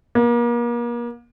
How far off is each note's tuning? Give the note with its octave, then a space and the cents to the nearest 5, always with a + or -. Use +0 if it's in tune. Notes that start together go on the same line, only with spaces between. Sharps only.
A#3 +35